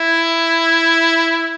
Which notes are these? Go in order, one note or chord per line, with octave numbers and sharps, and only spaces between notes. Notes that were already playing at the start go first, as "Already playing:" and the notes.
Already playing: E4